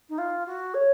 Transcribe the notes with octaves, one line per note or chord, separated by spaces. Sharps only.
D#4
F4
F#4
C#5